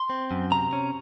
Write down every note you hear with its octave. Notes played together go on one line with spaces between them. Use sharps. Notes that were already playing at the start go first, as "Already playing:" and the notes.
Already playing: C6
C4
F#2
C3 A#5
C#4